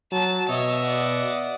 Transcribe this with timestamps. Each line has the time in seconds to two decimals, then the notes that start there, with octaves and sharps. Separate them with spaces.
0.12 F#3 A5
0.49 B2 C#5 D#5 E5
0.83 D5 F#5